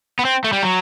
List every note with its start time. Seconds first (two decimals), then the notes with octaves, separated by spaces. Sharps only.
0.19 B3
0.25 C4
0.44 A3
0.53 G3
0.63 F#3